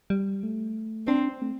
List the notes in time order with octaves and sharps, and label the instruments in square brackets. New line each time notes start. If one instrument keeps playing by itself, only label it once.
[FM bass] G3
A3
[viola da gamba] C4 [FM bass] D4
[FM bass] C4
A3